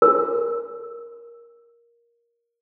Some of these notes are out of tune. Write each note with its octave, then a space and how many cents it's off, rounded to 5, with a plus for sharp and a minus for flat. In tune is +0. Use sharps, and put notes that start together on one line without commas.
A#4 +10